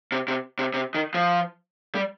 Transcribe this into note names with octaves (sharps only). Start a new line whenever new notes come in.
C3
C3
C3
C3
D#3
F3
G3